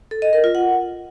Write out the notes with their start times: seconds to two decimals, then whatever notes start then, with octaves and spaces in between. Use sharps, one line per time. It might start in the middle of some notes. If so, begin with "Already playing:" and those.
0.11 A4
0.22 D#5
0.33 A#4
0.44 F4
0.55 F#5